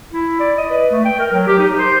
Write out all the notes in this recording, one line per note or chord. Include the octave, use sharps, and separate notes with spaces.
E4
D5
D#5
B4
A3
G5
A#4
F#3
G4
D#4
C5